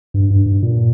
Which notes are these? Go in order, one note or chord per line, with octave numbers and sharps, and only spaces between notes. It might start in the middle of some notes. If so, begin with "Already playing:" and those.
G2
G2
G2
A#2